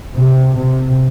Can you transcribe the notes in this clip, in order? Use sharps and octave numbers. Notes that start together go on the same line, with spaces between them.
C3
C3